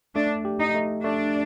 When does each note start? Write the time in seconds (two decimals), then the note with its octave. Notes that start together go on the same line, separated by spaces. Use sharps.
0.15 A3 D4
0.45 G4
0.60 D#4
0.75 A3
1.04 A3 D4